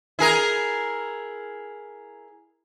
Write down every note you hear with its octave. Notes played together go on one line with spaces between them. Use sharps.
E4 G#4 A#4